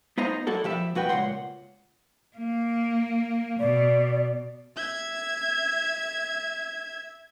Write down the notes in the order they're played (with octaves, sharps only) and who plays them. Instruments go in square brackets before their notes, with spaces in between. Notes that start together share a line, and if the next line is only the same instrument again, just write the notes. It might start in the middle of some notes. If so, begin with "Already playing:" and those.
[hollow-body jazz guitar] B3 D#4 C5 D#5 A#5
F#3 A#3 E4 F#4 A4 D5
F3 G4 E5 B5
F2 F#4 B4 G5
C#2 A#2 F#3 F#5 C6
[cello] A#3
[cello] B2 [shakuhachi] D5
[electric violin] E5 G#6